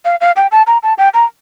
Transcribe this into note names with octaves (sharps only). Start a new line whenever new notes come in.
F5
F5
G5
A5
A#5
A5
G5
A#5